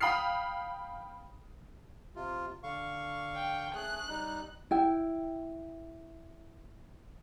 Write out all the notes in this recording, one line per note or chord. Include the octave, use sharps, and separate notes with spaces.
F5 G5 B5 D#6 F6 C7
C3 F4
D3 F5 C#6
G5
A3 G#4 F#6
G3 D#4
E4 G5